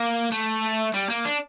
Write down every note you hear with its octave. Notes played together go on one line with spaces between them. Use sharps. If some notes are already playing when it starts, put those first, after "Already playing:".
Already playing: A#3
A3
G3
A#3
D4